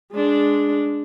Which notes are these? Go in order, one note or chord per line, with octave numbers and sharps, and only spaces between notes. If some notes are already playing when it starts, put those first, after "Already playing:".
G#3 D4